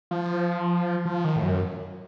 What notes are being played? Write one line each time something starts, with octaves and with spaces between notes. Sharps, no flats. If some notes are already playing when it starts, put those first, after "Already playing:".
F3
F3
D#3
A2
F#2